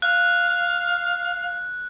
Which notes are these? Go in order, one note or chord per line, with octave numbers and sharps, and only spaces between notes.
F5 F#6